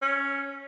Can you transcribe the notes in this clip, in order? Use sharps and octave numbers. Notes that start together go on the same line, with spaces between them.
C#4